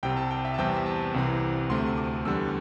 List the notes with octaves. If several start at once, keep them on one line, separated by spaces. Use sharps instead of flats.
C2 C3 G3 G5
A5
G5
E5
A5
E2 C3 G3 C4 G5
A5
C2 C3 E3 C4
D2 C3 A3 C4 C6
D6
E2 D3 G3 E6